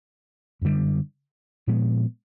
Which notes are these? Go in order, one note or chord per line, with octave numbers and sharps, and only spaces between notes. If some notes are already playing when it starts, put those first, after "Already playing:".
F#2 D3 G3
A#2 F3 G#3 B3